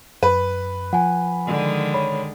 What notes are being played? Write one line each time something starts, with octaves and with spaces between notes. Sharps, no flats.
F#2 B4
F3 F#5 G#5
D3 D#3 G#3
C#5 B5